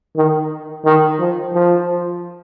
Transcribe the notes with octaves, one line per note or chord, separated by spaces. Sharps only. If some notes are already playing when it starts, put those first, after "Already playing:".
D#3
D#3
F3
F3